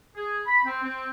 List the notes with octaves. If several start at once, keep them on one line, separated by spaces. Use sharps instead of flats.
G#4
B5
C4
C4